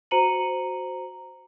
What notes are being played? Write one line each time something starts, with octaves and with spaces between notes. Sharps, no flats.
F#4 C5 A#5 C#7 D#7 F#7